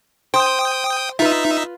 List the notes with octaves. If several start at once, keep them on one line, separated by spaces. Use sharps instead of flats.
C5 G5 D#6
D#4 F4 B4 E5